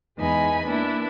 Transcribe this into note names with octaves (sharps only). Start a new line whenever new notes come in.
E2 G#3 D#4 G#5 B5
A#3 B3 D4 E4